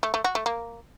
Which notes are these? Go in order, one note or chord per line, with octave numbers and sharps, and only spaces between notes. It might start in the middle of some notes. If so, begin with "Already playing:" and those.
A3
A3
F#4
A3
A#3